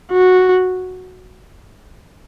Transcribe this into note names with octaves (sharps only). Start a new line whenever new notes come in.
F#4